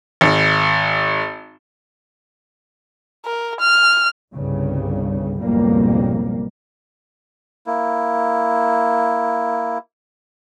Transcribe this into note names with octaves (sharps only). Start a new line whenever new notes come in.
G#1
A#4
F6
G1 C2 G2 C#3
F#1 B1 F2 G#2 G3 A#3
A#3 E4